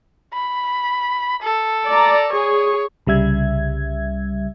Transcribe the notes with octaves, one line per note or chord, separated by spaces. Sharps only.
B5
A4
D5 A#5
G#4 C#5
C2 C#3 G3 E5 G#6